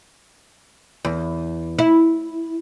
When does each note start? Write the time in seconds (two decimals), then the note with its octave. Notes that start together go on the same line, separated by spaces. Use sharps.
1.05 E2
1.79 E4